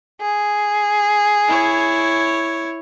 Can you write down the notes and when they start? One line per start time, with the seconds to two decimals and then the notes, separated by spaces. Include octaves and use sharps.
0.20 G#4
1.48 E4 C#5